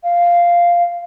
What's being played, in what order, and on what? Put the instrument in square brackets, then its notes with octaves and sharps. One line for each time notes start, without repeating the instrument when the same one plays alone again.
[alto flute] F5